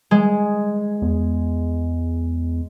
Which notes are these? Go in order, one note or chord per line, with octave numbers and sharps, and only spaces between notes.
G#3
E2